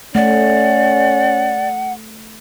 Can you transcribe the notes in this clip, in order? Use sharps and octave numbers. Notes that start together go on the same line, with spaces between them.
A3 C#4 D5 F#5